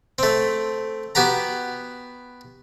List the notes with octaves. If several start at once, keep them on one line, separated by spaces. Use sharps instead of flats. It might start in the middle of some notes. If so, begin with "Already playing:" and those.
A3 C4
B3 F#4 G4 A#5